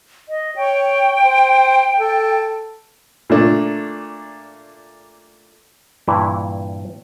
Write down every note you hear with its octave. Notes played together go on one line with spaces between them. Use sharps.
D#5
C#5 G5
C5
A4
A#2 A3 D4
G2 A#2 E3 E4